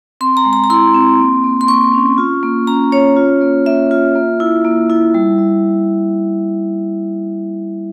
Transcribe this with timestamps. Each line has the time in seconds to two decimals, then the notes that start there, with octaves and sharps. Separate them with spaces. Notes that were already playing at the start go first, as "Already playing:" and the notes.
0.21 C4 C6
0.37 A#5
0.45 G#3
0.53 A#5
0.64 A#5
0.70 E4 C6
0.94 C4
1.19 A#3
1.44 A#3
1.61 C6
1.68 A#3 C#6
1.93 C#4
2.18 F4
2.43 A#3
2.67 C#4 A#5
2.92 C#4 C#5
3.16 F4
3.41 A#3
3.66 A#3 E5
3.91 F4
4.16 A#3
4.40 E4
4.65 A#3
4.90 E4
5.14 G3
5.38 G3